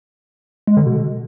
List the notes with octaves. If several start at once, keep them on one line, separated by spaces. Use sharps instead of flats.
G#3
D3
B2